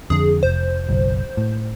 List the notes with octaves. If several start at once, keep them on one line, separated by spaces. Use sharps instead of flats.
F2 D3 G#4
F1 C5
F#1 B1
A2